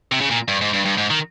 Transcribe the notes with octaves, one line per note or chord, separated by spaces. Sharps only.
C3
C#3
A#2
G2
G#2
G2
G2
G#2
D#3